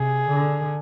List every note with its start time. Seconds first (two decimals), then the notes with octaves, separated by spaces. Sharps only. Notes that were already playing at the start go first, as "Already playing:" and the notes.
Already playing: C3 G#4
0.28 D3